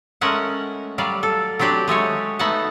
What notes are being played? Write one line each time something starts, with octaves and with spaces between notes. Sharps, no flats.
G#3 A3 C#4 A#4 F#5
F#3 G3 D5 F5
A4
F#3 C4 D4 G4 D5
G#3 A3 F#4 C#5
A3 B3 D#4 F#5 A5